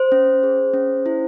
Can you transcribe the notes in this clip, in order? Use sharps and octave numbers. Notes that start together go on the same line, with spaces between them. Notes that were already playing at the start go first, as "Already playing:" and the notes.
Already playing: C5
C#4
G#4
C#4
E4